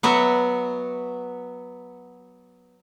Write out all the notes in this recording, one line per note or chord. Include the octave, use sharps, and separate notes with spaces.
F#3 B3 F#4 E5